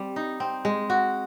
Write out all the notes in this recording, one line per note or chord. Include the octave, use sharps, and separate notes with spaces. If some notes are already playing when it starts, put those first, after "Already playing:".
Already playing: G3 C4
D#4
C4
G#3
F#4